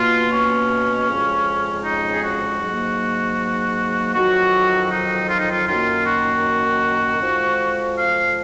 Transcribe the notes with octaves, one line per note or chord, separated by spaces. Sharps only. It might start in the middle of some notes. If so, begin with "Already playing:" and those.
Already playing: B2 A#3 F4
C#4
F2 C#3 G#3
D#4
G#4
F#4
G#2 F#3 A#3
F2 D#3 F#3 F#4
D#4
F4
D#4
F4
F#2 D#3 A#3 F4
F#4
F2 F3 G#3
F5